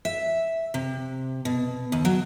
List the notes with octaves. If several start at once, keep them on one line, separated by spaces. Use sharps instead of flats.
E5
C3
B2
D#2
F#3